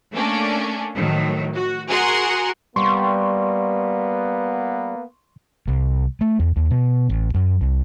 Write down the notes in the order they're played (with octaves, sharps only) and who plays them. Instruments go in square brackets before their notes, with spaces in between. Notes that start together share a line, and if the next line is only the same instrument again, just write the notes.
[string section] A3 A#3 C#4 D4
A2 D#3 F3 F#3 A3
F#4
F#4 G#4 A#4 F#5 C6
[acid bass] G3 [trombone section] A#3 B3 [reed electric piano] C6 C#6
[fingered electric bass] C2
A3
E2
D#2
B2
A1
F#2
C2